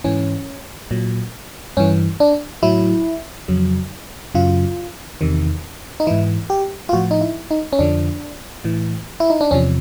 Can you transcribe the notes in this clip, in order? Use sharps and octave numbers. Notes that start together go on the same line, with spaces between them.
G#2 E3 C#4
A#2 F#3
G2 E3 C#4
D4
A2 F#3 E4
F2 C#3 F#3
F#2 C#3 F#3 F4
E2 C3 D#3
D#4
G#2 E3 E4
G4
F4
A2 F3 F#4
D#4
E4
D#4
C#4
F2 D3 F3 D4
A2 E3
E4
D#4
D4
E2 C3 F3 C#4